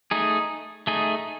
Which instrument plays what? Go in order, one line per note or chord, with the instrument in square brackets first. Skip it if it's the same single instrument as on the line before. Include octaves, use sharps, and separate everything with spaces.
[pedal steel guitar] A3 D#4 G#4
A3 D#4 G#4